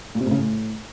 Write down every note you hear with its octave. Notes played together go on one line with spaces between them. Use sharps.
A#2
C3
A2
C#3
A2